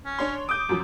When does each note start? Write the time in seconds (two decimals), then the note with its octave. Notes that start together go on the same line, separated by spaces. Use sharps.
0.05 C#4
0.19 D4 C#5 C6
0.49 D6 D#6 G6
0.69 F#2 F3